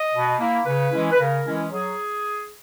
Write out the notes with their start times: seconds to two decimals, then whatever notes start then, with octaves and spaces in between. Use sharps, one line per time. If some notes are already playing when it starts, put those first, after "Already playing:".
Already playing: D#5
0.13 B2
0.39 A#3 E4
0.65 C#3 B4
0.92 E3 G#3 C#4 E4
1.12 B4
1.19 C#3 A#4
1.45 E3 G#3 C#4 E4
1.71 F#3 G#4